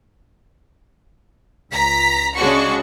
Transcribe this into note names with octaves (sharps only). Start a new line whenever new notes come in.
C#2 A#5 B6
C#3 G#3 D4 F#4 C#6